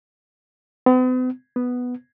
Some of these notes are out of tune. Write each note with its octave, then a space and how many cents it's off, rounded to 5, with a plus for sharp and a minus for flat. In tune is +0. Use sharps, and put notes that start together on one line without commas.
B3 +45
B3 +0